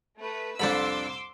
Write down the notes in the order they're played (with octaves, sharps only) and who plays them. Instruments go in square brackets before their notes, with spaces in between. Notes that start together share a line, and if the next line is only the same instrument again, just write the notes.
[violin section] A3 B4
[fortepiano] C2 F2 [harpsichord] D4 A4 B5 [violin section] C6 D6 E6